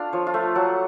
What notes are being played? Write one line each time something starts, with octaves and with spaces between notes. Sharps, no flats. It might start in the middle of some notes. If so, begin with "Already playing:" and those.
Already playing: A3 D4 F4 F5
F3 C#5
F4
A3
F#3 F#5